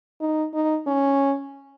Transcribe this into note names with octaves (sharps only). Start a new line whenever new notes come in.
D#4
D#4
C#4